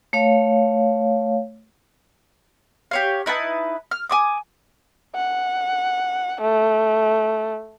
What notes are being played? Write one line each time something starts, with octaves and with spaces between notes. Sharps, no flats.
A3 C#5 F5
G4 C#5 F5
D#4 E4 B4 A5
F6
G#5 D6 D#6
F#5
A3